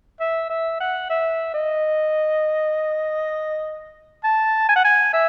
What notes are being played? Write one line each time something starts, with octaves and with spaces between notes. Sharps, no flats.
E5
E5
F#5
E5
D#5
A5
G#5
F#5
G#5
E5